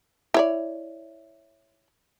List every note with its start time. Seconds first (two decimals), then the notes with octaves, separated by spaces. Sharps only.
0.34 E4 C#5 D5